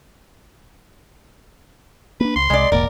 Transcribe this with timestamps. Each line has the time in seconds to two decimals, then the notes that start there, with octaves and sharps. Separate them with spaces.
2.20 A#3 D4 B4
2.36 C#2 C6
2.50 C2 G#3 D5
2.72 E1 A1 A#3 A#4 D5